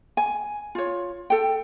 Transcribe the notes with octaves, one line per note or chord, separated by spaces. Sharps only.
G#5
F4 C#5
A4 G5